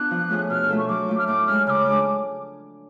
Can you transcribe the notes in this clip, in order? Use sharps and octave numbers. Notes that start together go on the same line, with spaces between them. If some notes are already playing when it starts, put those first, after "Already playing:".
Already playing: B3 D4 F4 F#6
F3
A3 C#4 F4 G#4
B2 F6
A3 F4 A4
C#6
F#3 D6
A3 F4
F6
A2 D6
G#3 C#4 F6
C#3 D6 F6
G#3 D4 G#4